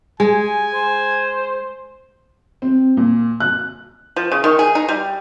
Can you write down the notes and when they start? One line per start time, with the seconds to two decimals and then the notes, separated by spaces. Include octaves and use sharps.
0.20 G#3 G#5
0.74 C5
2.62 C4
2.97 A#2
3.40 F#6
4.16 F3
4.31 C#3
4.44 D#3
4.59 G#4
4.75 D#4
4.89 G3